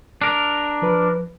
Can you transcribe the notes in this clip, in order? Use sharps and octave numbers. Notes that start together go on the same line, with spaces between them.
D4 A#4
F3 B4